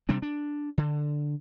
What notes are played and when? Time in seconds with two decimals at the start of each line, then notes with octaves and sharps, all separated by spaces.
0.09 C3 G3 C4 D4
0.22 D4
0.78 D3